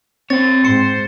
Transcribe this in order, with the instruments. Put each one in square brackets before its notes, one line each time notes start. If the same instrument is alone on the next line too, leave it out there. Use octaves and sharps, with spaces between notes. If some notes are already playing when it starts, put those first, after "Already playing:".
[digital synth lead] C4 [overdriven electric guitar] C#5 G5 [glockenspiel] A6
[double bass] G#2 [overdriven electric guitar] C5 [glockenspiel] C#7